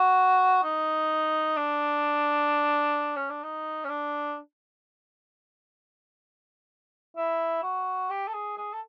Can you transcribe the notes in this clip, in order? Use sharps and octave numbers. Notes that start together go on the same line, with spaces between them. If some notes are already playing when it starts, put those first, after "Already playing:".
Already playing: F#4
D#4
D4
C#4
D4
D#4
C#4
D4
E4
F#4
G4
A4
G#4
G#4
A4